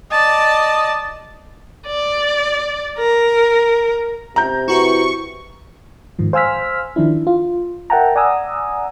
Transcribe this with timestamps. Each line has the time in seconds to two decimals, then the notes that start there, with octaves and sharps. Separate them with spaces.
0.12 D5 D#5 A5
1.87 D5
2.98 A#4
4.36 C3 A#5 G6
4.68 E4 F#4 B4 C#6
6.19 G#2 D#3 F3
6.33 C5 F5 G#5 E6 F6 B6
6.96 D#3 F3 D4 E4
7.27 F4
7.90 A#4 E5 F#5 G5 A5 A#5
8.16 D5 F#5 G#5 A#5 D#6 E6